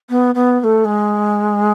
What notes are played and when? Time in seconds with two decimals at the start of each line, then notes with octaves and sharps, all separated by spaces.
0.09 B3
0.35 B3
0.60 B3
0.64 A3
0.85 G#3